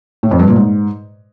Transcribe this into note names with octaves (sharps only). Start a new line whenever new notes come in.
A2
F2
G2
A#2
G#2